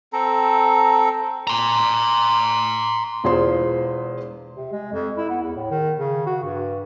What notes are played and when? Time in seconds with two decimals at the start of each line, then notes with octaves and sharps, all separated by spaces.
0.13 C4 A4 A#5
1.47 A#5 C6
3.24 E1 E2 F4 G#4 C5 C6
4.56 C3
4.72 G#3
4.93 F2
5.17 E4
5.29 B3
5.42 E2
5.56 A2
5.70 D#3
5.99 C#3
6.26 F#4
6.43 G2